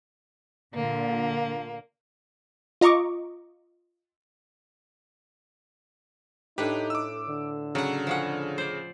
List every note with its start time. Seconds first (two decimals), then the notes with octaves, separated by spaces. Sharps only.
0.75 A#2 D3 A#3
2.81 F4 D#5 A#5 C#6 D6
6.58 A2 D4 D#4 G4 B4
6.90 D6 E6
7.29 D3
7.75 C#3 F#3 F#5
8.07 F3 C#4 F#5
8.58 C5 D5